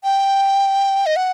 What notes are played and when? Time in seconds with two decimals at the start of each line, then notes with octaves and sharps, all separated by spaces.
0.04 G5
1.06 D#5
1.16 F#5